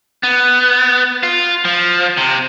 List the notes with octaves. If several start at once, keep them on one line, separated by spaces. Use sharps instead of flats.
B3
F4
F3
C3